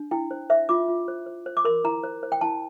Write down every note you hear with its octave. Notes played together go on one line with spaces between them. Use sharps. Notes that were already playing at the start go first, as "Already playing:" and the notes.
Already playing: D4
E4 G5
C5
C5 E5
F4 D6
F4
C5
C5
C5
D6
A#4 C6
E4 A#5
C5
C5
G5
E4 A5